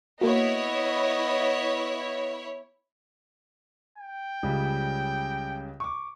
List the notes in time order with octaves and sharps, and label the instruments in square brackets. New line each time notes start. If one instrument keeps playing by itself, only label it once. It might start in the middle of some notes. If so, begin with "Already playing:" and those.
[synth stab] A#3 F#4 [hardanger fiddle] B3 D#5 [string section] E4 C#5
[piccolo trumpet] G5
[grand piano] C#2 C#3 G3
C#6 D6